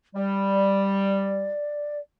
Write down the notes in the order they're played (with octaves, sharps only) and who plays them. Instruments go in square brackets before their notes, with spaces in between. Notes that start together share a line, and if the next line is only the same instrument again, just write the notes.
[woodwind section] G3 [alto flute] D5